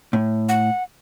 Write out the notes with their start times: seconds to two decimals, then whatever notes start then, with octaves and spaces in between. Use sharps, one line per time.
0.13 A2
0.49 F#5